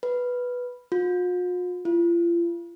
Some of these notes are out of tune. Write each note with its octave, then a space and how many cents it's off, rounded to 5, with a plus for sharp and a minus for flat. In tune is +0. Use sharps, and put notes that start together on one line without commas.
B4 -5
F4 +45
F4 -40